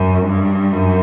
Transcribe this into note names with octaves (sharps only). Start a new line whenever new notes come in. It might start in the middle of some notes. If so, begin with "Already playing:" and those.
Already playing: F#2
G2
F#2